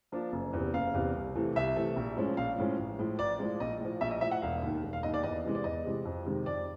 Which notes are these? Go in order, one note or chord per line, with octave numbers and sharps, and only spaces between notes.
F3 A#3 D4
F#1
E2 C3
F#1 F5
E2 C3
C2
C3 E3 A3
C2 E5
C3 E3 A3
A#1
A2 F3 G#3 C#4
A#1 F5
A2 F3 G#3 C#4
A1
A2 F3 G#3
A1 D5
A2 F3 G#3
A#1 D#5
A2 F3
A#1 E5
D#5
A2 F3 E5
F#5
E1 F5
D#2 D#3
E1
F5
D#2 D#3 D#5
D5
E2 D#5
C3 E3 G#3
D5
E2 D#5
C3 E3 G#3
F2
C3 D#3 G#3
F2 D5